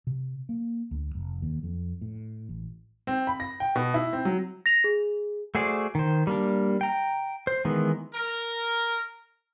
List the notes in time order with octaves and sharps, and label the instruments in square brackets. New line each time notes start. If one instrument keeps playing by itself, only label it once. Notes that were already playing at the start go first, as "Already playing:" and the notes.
[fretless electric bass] C3
A#3
D2
F1
D#2
F2
A2
A1
[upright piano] C4
B5
A#6
G5
B2
E4
C4
F#3
[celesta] A#6 F7
G#4
[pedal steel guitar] A3 F#4 G#4 C5 D5
D#3 C5
G3 A#3 D4
G5 A#5
C5
D#3 E3 G#3 B3
[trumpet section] A#4